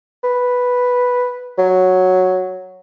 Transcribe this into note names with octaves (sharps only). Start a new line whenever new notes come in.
B4
F#3